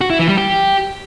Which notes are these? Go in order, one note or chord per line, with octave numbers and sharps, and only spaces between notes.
F#4
E4
E3
G3
G4